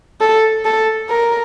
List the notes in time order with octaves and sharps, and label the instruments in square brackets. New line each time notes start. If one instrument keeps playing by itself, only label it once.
[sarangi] A4
A4
A#4